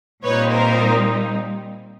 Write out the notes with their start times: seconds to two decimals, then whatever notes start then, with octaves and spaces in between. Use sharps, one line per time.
0.24 A#2 G3 C4 D#4 B4 C#5
0.51 A#4 C5